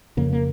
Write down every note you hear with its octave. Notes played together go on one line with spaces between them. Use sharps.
F2 C#3 A#3
A#3